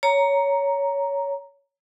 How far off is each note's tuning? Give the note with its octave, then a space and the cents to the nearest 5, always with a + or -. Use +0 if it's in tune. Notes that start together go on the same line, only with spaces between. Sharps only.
C#5 +15 A#5 +0